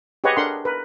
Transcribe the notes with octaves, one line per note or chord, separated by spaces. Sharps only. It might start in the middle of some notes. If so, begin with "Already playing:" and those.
G4 G#4 B4 C#5 D#5 F#5
D4 A4 A#4 F#5 C6
A#4 B4